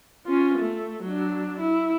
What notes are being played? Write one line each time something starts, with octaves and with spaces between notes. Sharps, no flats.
C#4 F4
A3
F#3 D4
E4